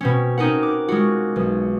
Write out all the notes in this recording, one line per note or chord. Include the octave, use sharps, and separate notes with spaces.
B2 C4 C#4
C4 C#4 D#4 F#4 A#4 F#5
D6
G#3 F4 F#4
B1